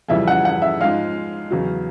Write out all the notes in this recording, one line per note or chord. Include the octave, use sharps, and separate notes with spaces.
F2 C#3 E3 G3 E5
F#5
F#5
E5
G#2 F3 G#3 F5
E2 C#3 F#3